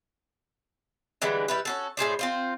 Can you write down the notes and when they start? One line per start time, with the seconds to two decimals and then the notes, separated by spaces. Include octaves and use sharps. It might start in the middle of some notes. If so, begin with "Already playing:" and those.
1.22 D3 E3 G3 G#3
1.48 G3 E4 B4
1.65 C#4 F#4 A4
1.97 A2 G#4 C5 D5
2.19 C4 F4 C5